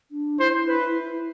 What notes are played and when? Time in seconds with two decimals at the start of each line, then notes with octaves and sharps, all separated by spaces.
0.11 D4
0.39 E4 C5
0.68 B4